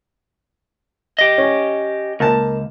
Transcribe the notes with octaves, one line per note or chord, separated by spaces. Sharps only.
G4 D#5
C#4
C#2 A#3 A5